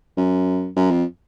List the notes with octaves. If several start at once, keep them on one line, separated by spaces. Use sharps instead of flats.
F#2
F#2
F2